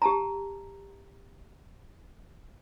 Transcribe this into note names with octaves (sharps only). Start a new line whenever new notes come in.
G4 A5 A#5